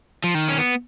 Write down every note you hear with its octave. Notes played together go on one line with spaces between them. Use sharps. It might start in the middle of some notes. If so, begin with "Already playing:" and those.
F3
D#3
C#4
B3